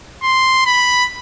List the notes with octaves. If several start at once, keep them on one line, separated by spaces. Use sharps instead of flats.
C6
B5